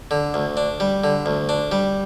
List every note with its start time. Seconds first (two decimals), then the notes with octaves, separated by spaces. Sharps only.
0.11 D3
0.34 D2
0.57 D4
0.80 G3
1.04 D3
1.26 D2
1.49 D4
1.72 G3